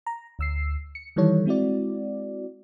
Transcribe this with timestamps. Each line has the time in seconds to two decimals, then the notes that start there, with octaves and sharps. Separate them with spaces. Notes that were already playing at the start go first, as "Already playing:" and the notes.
0.07 A#5
0.39 D2 E6 C7
0.95 C#7
1.16 D#3 E3 G3 A4 C#5
1.46 G#3 C4 E4 F#4 D5